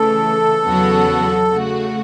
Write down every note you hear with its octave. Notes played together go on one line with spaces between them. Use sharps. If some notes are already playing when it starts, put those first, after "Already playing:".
Already playing: C#3 E3 A3 A4
E2 C#3 F#3 B3 F#4
C#3 A3 F#4